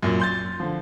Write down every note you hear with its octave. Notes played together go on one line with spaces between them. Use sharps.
F#2 A#2
C6 G6 A6
D3 F3